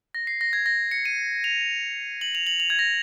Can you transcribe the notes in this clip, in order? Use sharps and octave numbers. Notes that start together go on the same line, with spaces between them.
A#6
C7
A#6
G#6
A#6
C#7
D#7
F7
F#7
F7
F#7
F7
G#6
A#6